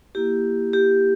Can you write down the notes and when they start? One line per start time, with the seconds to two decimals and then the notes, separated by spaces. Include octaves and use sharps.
0.15 A#3 E4 G4
0.73 G4